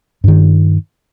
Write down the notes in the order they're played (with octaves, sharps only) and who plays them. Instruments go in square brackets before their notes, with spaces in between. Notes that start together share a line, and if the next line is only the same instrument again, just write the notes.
[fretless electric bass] G2 D#3